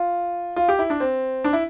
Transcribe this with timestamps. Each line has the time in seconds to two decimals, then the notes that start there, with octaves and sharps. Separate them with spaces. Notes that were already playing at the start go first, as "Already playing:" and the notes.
Already playing: F4
0.56 F4
0.69 G4
0.79 E4
0.90 D4
1.00 C4
1.44 D4
1.53 E4